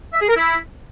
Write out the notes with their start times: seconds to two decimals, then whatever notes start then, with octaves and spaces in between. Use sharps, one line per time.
0.13 E5
0.21 G#4
0.29 A#4
0.37 E4